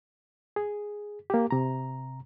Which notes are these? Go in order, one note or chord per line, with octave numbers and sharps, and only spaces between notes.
G#4
A#3 G4
C3 A#5